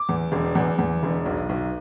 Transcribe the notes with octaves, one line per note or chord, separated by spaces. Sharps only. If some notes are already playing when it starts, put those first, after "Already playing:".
Already playing: D6
E2
E1
E2
E2
E1
B1
B1